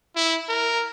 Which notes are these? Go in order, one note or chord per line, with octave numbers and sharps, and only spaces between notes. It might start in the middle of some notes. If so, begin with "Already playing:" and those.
E4
A#4